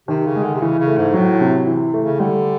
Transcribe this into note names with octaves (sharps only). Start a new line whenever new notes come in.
C3 D#3
C#3
G#3
D3
C3
C#3 E3
C#3
A3
G#2
A2 F#3
C3
E3
A3
C#3
D3 G3